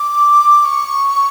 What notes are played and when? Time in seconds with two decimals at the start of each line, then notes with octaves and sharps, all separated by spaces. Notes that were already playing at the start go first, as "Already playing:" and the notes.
Already playing: D6
0.65 C#6